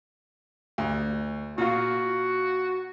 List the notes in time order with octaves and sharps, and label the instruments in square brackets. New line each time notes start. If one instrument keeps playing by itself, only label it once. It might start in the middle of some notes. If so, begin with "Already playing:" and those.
[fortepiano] D2
[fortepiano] A#2 F4 [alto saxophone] F#4